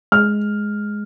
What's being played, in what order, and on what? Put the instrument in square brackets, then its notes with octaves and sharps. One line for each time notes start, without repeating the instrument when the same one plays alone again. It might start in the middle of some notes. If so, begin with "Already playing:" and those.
[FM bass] G#3 [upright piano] F6